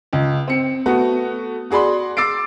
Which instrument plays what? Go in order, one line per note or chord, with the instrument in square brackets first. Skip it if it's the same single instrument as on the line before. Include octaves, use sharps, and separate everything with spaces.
[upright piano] C#2
C4 C#7
A3 B3 F#4
F#4 G#4 D5 B5 C6
C6 D6 E6 A6 C7 D7